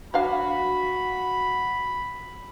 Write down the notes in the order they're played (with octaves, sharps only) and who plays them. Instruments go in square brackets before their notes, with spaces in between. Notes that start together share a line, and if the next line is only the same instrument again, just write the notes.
[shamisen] F#3 D4 F5 [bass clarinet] F#4 [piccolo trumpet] B5